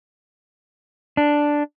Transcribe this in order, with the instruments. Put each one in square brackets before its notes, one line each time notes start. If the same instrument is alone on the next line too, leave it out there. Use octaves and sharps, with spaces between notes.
[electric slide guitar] D4